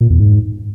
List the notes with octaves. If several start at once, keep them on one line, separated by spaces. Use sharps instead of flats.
A#2
E2
G#2